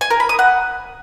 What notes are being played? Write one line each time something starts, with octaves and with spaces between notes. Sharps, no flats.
G#5
A#4
B5
D#6
F#5